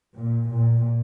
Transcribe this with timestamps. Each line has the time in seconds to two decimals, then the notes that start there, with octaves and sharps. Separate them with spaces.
0.15 A#2
0.50 A#2